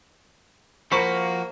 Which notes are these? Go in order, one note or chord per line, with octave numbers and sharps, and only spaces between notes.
F3 A#3 F#4 C5 B5 C#6 B6